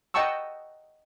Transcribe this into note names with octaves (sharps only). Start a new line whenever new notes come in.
D#5 F#5 G5 A5 C#6 E6